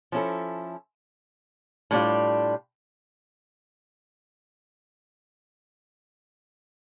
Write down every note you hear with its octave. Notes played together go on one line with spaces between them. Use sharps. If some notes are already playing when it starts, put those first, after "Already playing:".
F3 C#4 E4 A4
A2 G3 D4 F4